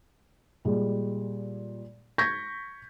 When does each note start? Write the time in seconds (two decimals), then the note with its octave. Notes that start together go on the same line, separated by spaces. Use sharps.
0.65 A#2 G3 G#3
2.18 C#6 G6 G#6 A#6 B6